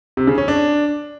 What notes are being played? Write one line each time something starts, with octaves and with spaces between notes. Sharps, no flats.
C3
C#3
C#4
D4